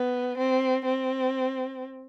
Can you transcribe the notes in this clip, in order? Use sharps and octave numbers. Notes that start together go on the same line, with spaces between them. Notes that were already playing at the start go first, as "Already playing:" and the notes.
Already playing: B3
C4
C4